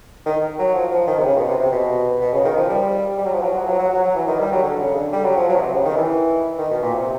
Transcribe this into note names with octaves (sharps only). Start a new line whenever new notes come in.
D#3
F#3
F3
F3
D#3
C3
C#3
B2
C3
C3
B2
B2
C#3
D#3
F3
G3
G3
F#3
F3
F#3
F3
F#3
F#3
F#3
F#3
E3
D#3
G3
F#3
D3
C#3
D3
G3
F#3
F3
F#3
B2
C3
C#3
D#3
E3
D#3
B2
A#2
C3